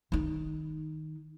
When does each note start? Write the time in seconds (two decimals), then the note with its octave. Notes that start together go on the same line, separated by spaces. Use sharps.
0.12 D#3 D#4